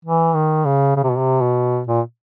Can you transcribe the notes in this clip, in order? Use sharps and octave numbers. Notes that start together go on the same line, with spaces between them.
E3
D#3
C#3
C#3
C3
B2
C3
B2
A#2